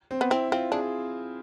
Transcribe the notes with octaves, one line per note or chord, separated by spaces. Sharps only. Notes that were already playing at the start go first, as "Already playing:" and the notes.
C4
B3
C4 E4
C4 F4
D4 G#4